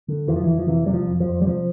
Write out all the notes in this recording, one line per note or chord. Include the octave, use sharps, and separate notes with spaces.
D3
F2 E3
F3
F2 E3
F3
C3 E3
C3 G3
F3
F2
F3
F2
G3
C3 F3